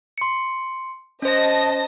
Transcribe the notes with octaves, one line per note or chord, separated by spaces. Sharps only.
C6 C#7
C#4 C5 D#5 A5 A#6